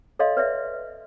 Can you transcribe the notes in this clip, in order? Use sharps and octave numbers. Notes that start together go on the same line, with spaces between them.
A4 C#5 D#5 F5 C6
B4 C#5 D5 E5